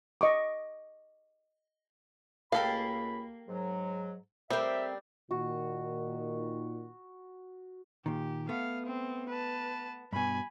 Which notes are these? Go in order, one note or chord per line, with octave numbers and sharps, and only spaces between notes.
D#5 C#6 D6
C#2 A#3 G4 A4 F5 B5
G#2 F#3
G3 C4 A#4 E5
A#2 D#3 F#4
A#2 D#3 G4
A3 B3 F5
C4
B4 A5
G2 B2 G#5 B5